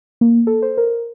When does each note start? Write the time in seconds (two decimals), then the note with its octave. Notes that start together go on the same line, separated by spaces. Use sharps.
0.21 A#3
0.47 A4
0.62 C5
0.77 A#4